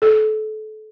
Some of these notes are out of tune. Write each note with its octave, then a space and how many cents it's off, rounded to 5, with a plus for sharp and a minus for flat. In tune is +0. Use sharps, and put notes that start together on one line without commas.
A4 -30